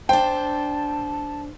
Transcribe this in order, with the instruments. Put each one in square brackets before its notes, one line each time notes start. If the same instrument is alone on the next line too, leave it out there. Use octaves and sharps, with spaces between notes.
[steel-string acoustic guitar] D4 C5 [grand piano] G5 [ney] A5